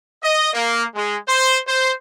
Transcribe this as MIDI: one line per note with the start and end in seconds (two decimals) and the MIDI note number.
0.24 0.52 75
0.53 0.84 58
0.95 1.17 56
1.28 1.59 72
1.67 1.92 72